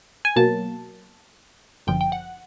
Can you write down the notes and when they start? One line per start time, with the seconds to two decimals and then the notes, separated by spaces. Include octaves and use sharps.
0.25 G#5
0.36 B2 F#3 A#3 A5
1.87 G1 F#2 D3 F3 G5
2.01 G5
2.12 F#5